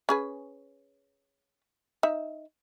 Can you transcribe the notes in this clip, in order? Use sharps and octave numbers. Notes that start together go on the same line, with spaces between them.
C#4 G#4 B4
D#4 E5